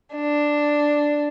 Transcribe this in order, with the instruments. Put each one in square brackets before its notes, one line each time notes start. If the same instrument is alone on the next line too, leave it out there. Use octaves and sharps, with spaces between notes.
[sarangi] D4